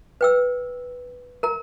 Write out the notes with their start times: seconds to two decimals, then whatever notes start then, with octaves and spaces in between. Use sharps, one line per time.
0.21 B4 G5 E6
1.43 A#4 A#5